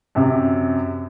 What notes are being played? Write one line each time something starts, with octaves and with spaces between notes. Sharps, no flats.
F#2 C3